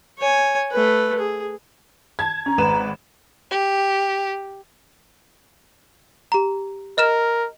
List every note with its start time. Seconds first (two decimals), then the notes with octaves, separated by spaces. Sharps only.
0.18 C#5 G#5
0.71 A3 B4
1.19 G#4
2.19 A5 G#6
2.46 C#4 A#5
2.58 G#1 B4 E7
3.51 G4
6.32 G4 A#5
6.98 A#4 D#5 F6 E7